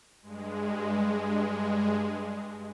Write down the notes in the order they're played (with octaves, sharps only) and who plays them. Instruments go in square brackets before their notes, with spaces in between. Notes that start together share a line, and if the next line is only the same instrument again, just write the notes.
[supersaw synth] G2 G#3